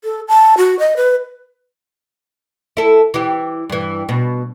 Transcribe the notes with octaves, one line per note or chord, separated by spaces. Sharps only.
A4
A5
F#4
D#5
B4
E4 A4
E3 G4
G2 E3
B2